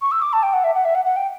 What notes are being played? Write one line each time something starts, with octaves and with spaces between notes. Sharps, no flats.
C#6
E6
D6
A5
G5
F#5
E5
F#5
E5
F#5
F#5
G5